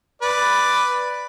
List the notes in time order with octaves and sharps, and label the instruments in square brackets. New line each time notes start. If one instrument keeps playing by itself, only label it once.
[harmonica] B4 D5